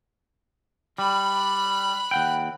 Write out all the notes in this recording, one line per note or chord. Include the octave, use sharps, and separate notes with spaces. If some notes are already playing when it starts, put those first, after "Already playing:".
G3 B5 F#6
D#2 F#5 G5